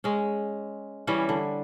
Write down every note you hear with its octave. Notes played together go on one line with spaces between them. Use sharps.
G#3 C#4
E3 G3 C#4
D3